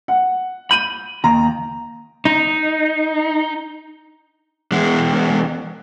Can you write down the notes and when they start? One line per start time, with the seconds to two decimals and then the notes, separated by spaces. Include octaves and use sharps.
0.08 F#5
0.71 B5 G6 D#7
1.24 D#2 D#3 A#5
2.25 D#4
4.72 E2 G#3